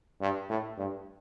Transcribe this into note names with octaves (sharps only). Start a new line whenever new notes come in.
G2
A2
G2